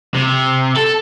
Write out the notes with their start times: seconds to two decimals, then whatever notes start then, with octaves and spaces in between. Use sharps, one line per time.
0.14 C3
0.76 A4